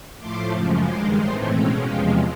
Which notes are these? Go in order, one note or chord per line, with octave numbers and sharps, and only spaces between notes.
A2 F3 A3 C6 D6
F#2 C#3 F3 G#3
G2 D#3 G#3 C6 D6
A2 E3 A3 C4 A#5 C6
B2 G#3 C#4 F5 G5
E2 C3 F3 G#3 F5 G5